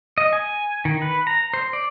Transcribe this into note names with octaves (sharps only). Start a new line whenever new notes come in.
D#5
G#5
D#3
B4
A#5
C5
D5